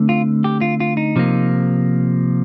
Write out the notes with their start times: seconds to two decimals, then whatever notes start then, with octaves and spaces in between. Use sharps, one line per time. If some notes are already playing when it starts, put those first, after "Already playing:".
Already playing: D3 A3 C4
0.09 F4
0.44 G4
0.61 F4
0.80 F4
0.97 D#4
1.16 C3 F3 A#3